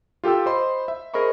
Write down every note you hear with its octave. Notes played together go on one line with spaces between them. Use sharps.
F4 G4 A4 G5 E6
C5 D#5 B5 C6
E5
G#4 A#4 C5 D#5 B5 C#6